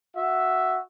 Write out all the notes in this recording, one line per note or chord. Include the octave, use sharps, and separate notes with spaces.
F#4 E5